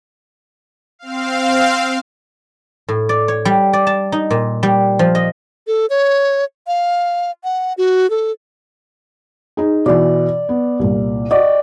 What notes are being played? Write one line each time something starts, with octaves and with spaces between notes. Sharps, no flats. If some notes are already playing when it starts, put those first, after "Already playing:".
C4 F5
A2
D5
C#5
G3
D5
A5
D#4
A#2
G3
F3
D#5
A4
C#5
F5
F#5
F#4
A4
D#4 G#4
B2 E3 D5
B3
C2 A#2
F#4 D5 D#5 G5